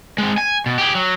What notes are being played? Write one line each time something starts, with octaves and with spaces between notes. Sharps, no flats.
G#3 C4
G#5
B2
G4 G#4
F#3